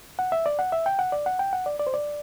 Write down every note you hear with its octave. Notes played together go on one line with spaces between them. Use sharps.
F#5
E5
D5
F#5
E5
G5
F#5
D5
F#5
G5
F#5
D5
D5
C5
D5